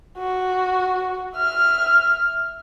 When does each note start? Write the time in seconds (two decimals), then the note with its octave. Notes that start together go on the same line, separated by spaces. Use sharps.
0.18 F#4
1.37 E5 F6